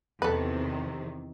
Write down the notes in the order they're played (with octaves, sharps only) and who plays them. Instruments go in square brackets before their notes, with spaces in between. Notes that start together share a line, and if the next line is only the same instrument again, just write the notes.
[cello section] E2 C3 D#3 [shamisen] A4 B4